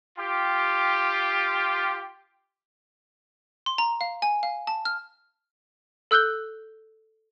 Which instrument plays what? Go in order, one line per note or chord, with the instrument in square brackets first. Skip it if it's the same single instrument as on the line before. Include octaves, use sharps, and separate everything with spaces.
[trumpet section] F4 G4
[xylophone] C6
A#5
F5
G#5
F5
A5
F6
A4 E6 F#6 G6 G7